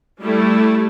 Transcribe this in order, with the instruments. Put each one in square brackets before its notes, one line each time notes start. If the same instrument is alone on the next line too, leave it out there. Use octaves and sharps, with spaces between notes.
[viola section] G3 A3 E4